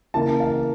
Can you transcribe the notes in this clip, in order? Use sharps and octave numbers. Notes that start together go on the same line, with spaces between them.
C#3 E3 A#3 A5
F5